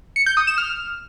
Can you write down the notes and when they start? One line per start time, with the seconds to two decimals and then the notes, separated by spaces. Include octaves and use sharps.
0.16 C#7
0.26 G6
0.37 D#6
0.47 E7
0.58 F6